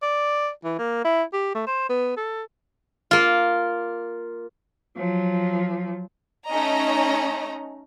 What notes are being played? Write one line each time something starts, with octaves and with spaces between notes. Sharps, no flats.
D5
E3
A#3
E4
G4
A3
C5
B3
A4
A#3 F4
F3 F#3
A3 C#4 D#4 D#5 A#5